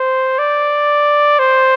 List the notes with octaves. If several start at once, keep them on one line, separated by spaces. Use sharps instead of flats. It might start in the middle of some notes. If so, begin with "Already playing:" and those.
Already playing: C5
D5
C5